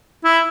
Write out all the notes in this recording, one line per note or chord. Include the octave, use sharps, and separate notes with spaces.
E4